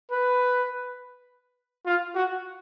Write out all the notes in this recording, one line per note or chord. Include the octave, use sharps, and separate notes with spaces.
B4
F4
F#4